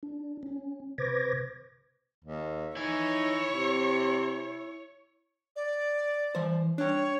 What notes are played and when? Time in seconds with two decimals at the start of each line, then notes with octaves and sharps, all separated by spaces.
0.03 D4
0.43 C#4
0.98 C3 B4 C5 D6 G#6 A#6
2.24 D#2
2.77 D#4 E4 C#5 G#5
3.51 C3
5.56 D5
6.35 E3 C5
6.78 D4 C#5 G5